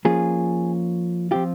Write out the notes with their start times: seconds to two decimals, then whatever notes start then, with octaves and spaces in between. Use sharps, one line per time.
0.05 F3 A#3 C#4 F4 G#4
1.31 F3 C4 F4 G4